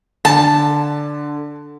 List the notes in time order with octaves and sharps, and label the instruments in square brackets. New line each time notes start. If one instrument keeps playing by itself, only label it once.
[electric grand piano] D3 [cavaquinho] A5